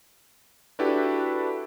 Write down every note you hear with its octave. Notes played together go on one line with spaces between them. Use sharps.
D4 E4 F#4 G4 A4 B4